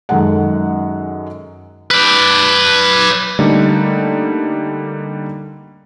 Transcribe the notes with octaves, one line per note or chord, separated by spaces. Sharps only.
F#2 D#3 G#3 A4 F#5
B4 D5
D3 G3 A3 A#3 D#4